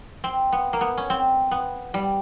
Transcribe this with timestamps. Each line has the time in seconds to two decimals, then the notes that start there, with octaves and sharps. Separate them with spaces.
0.24 C4
0.52 B3
0.73 A#3
0.81 B3
0.97 C#4
1.10 C4
1.51 B3
1.94 G3